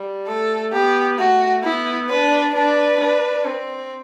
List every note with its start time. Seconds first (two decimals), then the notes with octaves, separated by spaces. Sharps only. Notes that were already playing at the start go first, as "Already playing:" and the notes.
Already playing: G3
0.28 A3 A4
0.73 B3 G4
1.18 A3 F#4
1.64 B3 E4
2.09 D4 B4
2.54 D4 B4
3.00 D4
3.45 C4